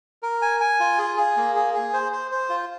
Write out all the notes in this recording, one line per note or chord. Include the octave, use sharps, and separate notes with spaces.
A#4
G#5
G#5
F4
G#4
G#4
A#3
G#4
G#4
C5
C5
C5
F4